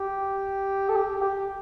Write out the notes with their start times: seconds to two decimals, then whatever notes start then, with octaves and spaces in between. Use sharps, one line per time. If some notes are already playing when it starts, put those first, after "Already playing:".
Already playing: G4
0.89 A4
0.96 G4
1.22 G4